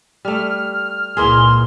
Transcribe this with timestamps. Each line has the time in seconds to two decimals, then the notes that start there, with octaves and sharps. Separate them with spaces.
0.25 G3 A3 F6
1.17 C#2 A#2 E3 A#3 G#4 C6